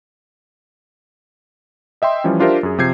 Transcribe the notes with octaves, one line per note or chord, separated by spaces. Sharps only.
D#5 E5 G5 C6
E3 F3 G3 C#4
D4 F4 G4 A#4 C5 E5
F#2 G#4
C3 F3 G6 G#6 C7